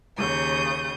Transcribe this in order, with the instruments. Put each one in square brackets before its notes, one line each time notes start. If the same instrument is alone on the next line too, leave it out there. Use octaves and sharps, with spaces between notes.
[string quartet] D#2 C#3 D#6 G6